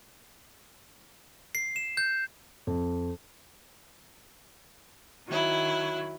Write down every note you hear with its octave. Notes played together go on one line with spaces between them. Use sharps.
C7
E7
G6
F2
D#3 F#3 E4